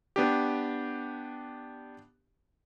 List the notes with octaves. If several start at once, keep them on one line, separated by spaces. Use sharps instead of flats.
B3 D4 G4